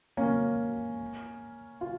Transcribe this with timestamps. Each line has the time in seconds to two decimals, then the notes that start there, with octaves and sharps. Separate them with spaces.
0.17 A#3 C#4
1.81 F4